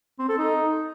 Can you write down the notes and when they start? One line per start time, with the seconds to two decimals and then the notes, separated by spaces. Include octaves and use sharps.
0.19 C4
0.29 A4
0.38 D#4